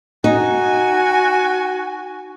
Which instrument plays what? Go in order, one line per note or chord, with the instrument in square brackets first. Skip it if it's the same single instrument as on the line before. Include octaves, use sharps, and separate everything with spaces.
[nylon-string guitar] D#4 [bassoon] F#4 [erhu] G#5